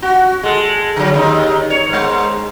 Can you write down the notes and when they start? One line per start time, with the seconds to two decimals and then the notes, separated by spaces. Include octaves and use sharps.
0.02 F#4
0.43 G#3 A4
0.96 D3 F#3
1.14 D#2 D#4
1.70 C#5
1.89 G#2 G#3